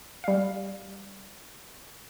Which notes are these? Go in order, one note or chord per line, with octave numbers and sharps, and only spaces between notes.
G3 F5